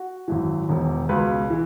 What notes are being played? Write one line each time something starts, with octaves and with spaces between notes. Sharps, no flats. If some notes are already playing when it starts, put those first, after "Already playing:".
Already playing: F#4
G#1 F#2 E3
E1 E2 D#3
C#2 B2 B4
E3